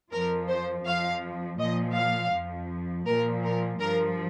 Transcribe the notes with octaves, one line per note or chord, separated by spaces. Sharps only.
F2 F3 A#4
C5
F2 F3 F5
A#2 F3 D#5
F5
F2 F3
A#2 F3 A#4
A#4
G2 F3 A#4